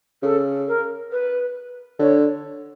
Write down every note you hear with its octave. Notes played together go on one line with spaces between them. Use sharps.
C#3 A4
A#4
B4
D3 C#5